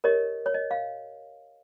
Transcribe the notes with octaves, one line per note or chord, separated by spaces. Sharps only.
G4 A#4 C#5 D#5
C#5
D#5
F5